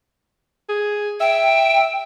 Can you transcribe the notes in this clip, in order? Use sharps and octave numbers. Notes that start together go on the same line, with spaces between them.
G#4
E5 G5